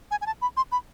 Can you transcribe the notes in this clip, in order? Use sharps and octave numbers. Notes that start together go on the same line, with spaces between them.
G#5
G#5
A5
B5
C6
B5